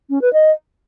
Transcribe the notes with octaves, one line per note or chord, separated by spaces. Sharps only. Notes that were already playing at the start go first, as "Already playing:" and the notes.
C#4
B4
D#5